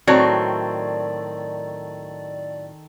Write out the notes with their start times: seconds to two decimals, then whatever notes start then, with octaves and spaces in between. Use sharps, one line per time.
0.07 A2 D#3 F#3 C4 F#4 A4 C#5 D5